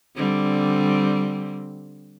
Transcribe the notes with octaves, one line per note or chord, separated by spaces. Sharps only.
D3 G3 C4